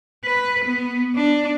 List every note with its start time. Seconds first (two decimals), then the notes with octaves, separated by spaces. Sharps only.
0.25 B4
0.65 B3
1.16 D4